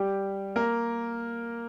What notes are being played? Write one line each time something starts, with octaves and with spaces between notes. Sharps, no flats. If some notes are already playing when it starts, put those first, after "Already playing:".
Already playing: G3 G4
A#3 A#4